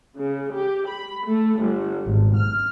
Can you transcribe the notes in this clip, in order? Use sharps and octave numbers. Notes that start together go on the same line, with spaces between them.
C#3
G4
B5
A3
G1
G#1
F6